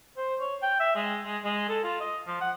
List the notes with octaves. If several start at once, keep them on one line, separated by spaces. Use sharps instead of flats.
C5
C#5
G5
E5
G#3
G#3
G#3
A4
F4
D#5
F3
F#5